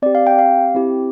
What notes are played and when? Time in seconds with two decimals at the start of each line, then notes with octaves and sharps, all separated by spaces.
0.02 C4 D5
0.06 G4
0.15 F5
0.27 G5
0.39 F5
0.74 C4 E4 G4